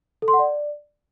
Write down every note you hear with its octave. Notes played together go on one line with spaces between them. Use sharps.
A4
C6
F#5
D5